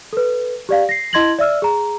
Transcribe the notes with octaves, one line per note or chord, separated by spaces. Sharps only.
A4 B4
G4 D5 F5
A#6 C7
E4 D#5 C6 G#6 A#6 F#7
D5 E5 E6 F6
G#4 A#5